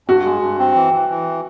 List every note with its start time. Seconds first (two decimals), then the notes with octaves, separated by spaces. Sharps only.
0.08 G2 F#4
0.25 G#3
0.41 G2
0.59 C4
0.75 E3
0.93 E3
1.09 E3